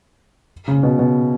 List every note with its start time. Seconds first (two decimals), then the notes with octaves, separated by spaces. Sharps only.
0.68 C#3
0.83 B2
0.99 B2